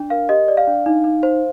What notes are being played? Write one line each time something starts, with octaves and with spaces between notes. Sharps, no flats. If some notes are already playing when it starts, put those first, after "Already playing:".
Already playing: D4
A#4 F5
G4 D#5
D5
F5
D4
D#4
D#4
C5